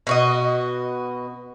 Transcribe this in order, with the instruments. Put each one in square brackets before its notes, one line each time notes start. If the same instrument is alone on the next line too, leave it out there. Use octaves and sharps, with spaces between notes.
[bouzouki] B2 F#4 D#5